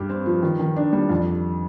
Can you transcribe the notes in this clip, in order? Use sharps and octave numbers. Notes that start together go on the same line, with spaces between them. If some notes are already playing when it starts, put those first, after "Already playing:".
Already playing: G2 G4
C4
F3
D#3
D#3
D4
G3
F2